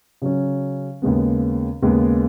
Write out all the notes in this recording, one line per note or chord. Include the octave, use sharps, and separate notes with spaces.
C#3 F#3 C#4
D#2 C#3 G#3 B3
D#2 C#3 G#3 B3